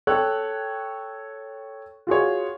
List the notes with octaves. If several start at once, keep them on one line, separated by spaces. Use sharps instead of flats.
A4 C#5 G5 F#6
F4 F#4 G#4 C#5